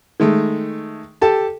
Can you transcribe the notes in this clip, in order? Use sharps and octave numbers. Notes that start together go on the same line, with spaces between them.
D#3 G#3 A3
G4 A4 A5